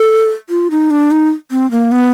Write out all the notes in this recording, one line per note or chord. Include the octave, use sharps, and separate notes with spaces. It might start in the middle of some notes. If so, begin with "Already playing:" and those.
Already playing: A4
F4
D#4
D4
D#4
C4
A#3
B3